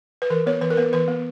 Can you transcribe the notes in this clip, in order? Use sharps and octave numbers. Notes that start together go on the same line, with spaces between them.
B4
E3 A#4
B3 C#5
E3 B4
A#4
B3 B4
E3 B4
B3